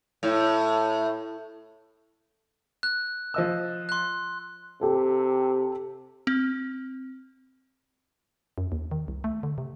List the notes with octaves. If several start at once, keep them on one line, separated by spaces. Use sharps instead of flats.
A2
F#6
F3 D#5 E6
C6 F#6
C3 G4 A4
C4
F#2
D#2
D#3
C2
A3
D3
C3